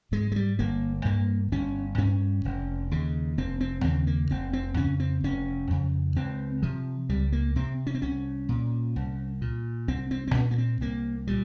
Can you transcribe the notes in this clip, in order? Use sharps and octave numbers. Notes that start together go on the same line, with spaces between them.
G#2 G#3
G#3
G3
G1 A#3
G2 A#3
G1 C#4
G2 C#4
F1
D#2 C#3
F1 C4
C4
D#2 C#3 C4
A#3
F1 C4
C4
F2 C#3 C#4
C4
F1 C#4
F2 C#3
C#2 C4
C3 F3
C#2 G3
A#3
C3 C4
C#4
C4
C2 C#4
A#2
C2
A#2
C2 C4
C4
C4
A#2 C#4
A#3
C4
C2 A#3
A#2 G3